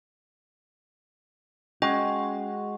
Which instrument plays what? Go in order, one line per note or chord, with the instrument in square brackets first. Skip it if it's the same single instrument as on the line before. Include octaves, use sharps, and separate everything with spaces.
[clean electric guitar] G#3 F#4 [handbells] C#4 D#5 G5